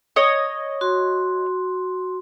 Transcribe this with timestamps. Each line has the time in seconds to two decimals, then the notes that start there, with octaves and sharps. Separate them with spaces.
0.16 C#5 D#5
0.81 F#4 C6